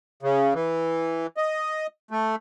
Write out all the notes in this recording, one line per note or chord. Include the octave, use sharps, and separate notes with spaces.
C#3
E3
D#5
A3